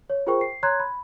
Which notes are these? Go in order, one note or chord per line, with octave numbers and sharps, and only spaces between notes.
C#5
F4 G#4 A#4 C5 G5 C#6
C7
C#5 A#5 C6 F#6 G#6
B5